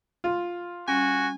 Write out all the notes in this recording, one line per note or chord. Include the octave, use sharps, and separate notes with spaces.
F4
G3 C#4 F#4 G#5